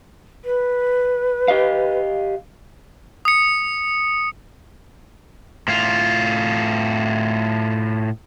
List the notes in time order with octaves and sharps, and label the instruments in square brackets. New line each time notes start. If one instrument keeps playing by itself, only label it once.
[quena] B4
[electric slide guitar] G4 D#5 F5
[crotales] D#6 C#7
[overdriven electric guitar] A2 F4